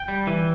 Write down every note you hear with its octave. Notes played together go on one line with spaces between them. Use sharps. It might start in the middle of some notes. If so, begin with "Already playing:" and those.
Already playing: G5
G3
E3